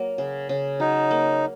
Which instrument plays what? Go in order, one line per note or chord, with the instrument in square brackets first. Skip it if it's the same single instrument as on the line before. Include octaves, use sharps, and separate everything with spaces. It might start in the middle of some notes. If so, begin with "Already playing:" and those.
Already playing: [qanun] F#3 A#3
C#3
C#3
[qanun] F#3 [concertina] D#4
[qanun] A#3